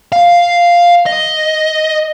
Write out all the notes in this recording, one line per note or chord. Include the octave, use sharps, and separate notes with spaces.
F5
D#5